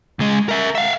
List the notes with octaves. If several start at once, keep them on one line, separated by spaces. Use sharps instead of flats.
C#2 G#3
A#4 E5
E5 F5